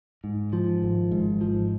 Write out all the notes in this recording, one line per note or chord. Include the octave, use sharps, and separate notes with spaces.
G#2
F3
G#1
G#2
F3